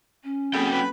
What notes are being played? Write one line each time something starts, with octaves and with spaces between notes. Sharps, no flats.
C#4
F#3 A#3 C4 G#4 A4 G5 B5
B4 B5